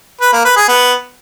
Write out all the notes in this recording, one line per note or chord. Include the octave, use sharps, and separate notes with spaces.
B4
A#3
B4
G#4
B3